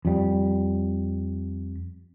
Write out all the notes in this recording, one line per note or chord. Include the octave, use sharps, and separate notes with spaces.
F2 G3